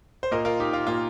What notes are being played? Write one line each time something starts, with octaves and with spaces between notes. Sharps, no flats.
C5
A#2 A#3 A#4 D#5
F4 A#4
D#4 G4
F4
A#2 A#3 F4